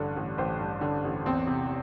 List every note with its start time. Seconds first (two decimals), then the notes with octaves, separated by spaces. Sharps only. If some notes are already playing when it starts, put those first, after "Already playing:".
Already playing: A1 G2 D3 D4
0.16 A1
0.38 A1 G4 C5
0.60 G2
0.81 D3
1.04 A1
1.26 E2 C4
1.47 C3